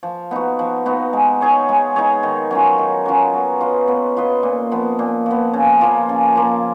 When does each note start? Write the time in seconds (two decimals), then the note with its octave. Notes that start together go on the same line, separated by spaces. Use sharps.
0.03 F3
0.31 B3 D#4 F#4
0.59 F3
0.86 B3 D#4 F#4
1.13 G#3
1.41 D#4 G#4 C#5
1.69 G#3
1.96 D#4 G#4 C#5
2.23 D#3
2.51 F#3 C#4 F4
2.78 D#3
3.06 F#3 C#4 F4
3.33 B3
3.61 F4 B4 D#5
3.88 B3
4.17 F4 B4 D#5
4.43 A#2
4.71 F3 B3
4.99 A#2
5.26 F3 B3
5.53 C#3
5.81 F3 A#3 F4
6.09 C#3
6.36 F3 A#3 F4